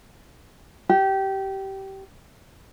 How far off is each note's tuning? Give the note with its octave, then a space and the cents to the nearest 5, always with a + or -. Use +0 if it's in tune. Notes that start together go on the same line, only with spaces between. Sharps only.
G4 -20